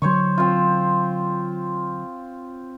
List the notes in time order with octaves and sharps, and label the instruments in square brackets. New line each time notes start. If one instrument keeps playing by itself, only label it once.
[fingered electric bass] D3 F#3 [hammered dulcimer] C5 C#5 C#6
[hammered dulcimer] C4 F4